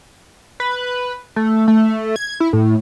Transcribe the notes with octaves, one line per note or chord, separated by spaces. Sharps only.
B4
A3
A3
G#6
E4
A2